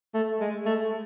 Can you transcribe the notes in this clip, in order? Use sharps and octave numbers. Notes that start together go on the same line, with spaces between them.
A3
G#3
A3